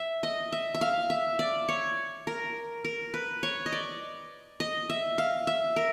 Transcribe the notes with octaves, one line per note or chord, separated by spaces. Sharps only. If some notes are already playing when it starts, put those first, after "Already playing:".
Already playing: E5
D#5
E5
E5
F5
E5
D5
C#5
A#4
A#4
B4
C#5
D#5
D5
D#5
E5
F5
E5
A#4